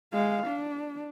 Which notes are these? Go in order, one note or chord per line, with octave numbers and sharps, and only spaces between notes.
G#3 F5
D4